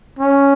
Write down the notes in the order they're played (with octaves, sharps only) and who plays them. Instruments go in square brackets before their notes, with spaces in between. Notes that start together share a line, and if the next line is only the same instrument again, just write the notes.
[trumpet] C#4